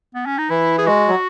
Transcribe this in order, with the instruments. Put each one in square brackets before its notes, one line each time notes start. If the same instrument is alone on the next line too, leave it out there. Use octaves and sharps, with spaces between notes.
[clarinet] B3
C#4
D#4
[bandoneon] E3 [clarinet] E4
[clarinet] G#4
[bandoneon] G#3 [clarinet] F#4
[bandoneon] F#3